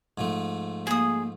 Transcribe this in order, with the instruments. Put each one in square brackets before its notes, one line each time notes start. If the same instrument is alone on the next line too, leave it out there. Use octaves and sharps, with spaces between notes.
[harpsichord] G#2 F3 A3
[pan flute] A#3 [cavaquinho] G#4 D#6